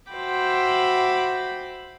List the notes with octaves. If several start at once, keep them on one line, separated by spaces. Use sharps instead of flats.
F#4 C5 E5 G5 B5 D6